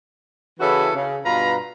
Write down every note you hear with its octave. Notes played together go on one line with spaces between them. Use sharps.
C#3 E3 C#4 E4 F#4 A4
C#3
G2 B2 F4 B4 A#5